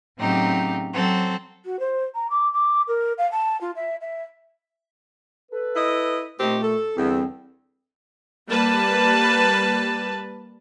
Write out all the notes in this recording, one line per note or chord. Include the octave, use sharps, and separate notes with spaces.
A2 C#3 F#3 C4 D#4 G4
F#3 C4 A4
F#4
C5
A#5
D6
D6
A#4
F5
A5
F4
E5
E5
A4 B4
E4 D#5
A#2 A3 C4 D#4 G4
A4
E2 D3 G3 C4
G3 A#3 B4 A5